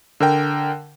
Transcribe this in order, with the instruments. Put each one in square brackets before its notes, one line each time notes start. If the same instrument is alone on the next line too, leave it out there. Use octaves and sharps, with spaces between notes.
[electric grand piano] D3 A#4 G5